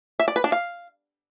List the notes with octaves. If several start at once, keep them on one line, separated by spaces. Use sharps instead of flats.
E5
D5
B4
D4
F5